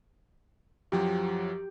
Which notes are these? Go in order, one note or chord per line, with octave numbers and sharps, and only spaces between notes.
F#2 F3 F#3 G4